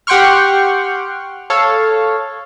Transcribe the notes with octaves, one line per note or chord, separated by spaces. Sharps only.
G4 F#5 G5 C6 C#6 F6
A4 C#5 F5